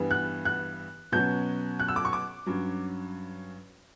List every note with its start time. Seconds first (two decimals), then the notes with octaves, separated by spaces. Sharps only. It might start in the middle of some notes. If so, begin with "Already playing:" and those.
Already playing: G2 E3 G3 B3
0.11 F#6
0.45 F#6
1.12 B2 F#3 C#4 G6
1.80 F#6
1.88 E6
1.96 D6
2.05 C#6
2.13 D6
2.46 G2 F#3 C#4